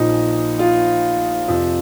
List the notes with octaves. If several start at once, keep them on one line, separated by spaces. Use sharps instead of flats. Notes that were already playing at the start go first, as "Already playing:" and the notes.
Already playing: A#1 A#2 F3 D#4
F4
F2 C3 F3